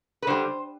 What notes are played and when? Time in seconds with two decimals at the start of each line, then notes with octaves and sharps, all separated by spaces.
0.22 B4
0.27 D3 G3 C5